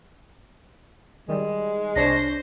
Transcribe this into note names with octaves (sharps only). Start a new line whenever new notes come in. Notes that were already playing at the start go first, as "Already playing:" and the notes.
D#3 G3 G#3
C2 D4 C5 C#5 A#6